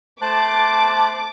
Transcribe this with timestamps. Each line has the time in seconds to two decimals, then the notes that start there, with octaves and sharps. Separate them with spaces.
0.21 A3 C5 A5 D6 F#6